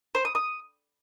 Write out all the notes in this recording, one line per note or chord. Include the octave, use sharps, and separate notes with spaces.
C5
D#6
D#6